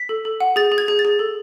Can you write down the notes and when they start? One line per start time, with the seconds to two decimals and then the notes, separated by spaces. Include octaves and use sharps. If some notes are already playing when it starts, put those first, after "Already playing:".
Already playing: B6
0.09 A4
0.25 A4
0.40 F#5
0.56 G#4 A6
0.72 G#4
0.78 G#6
0.88 G#4
0.99 A6
1.05 G#4
1.19 A4